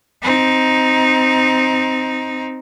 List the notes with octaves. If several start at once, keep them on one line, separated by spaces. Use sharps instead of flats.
C4 D#4